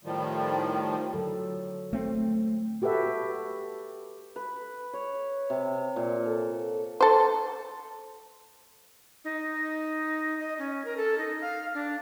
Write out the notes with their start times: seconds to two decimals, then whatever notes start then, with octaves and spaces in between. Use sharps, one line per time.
0.04 A2 D#3 F3 G3
1.13 D3 F#3 A4
1.93 A3 C4
2.82 F#4 G4 A4 B4 E5
4.36 B4
4.93 C#5
5.50 C3
5.96 A#2
6.26 A4
7.01 A4 C5
9.25 D#4
10.40 D#5
10.59 C#4
10.85 A#4
10.97 A4
11.18 D#4
11.41 F5
11.74 D4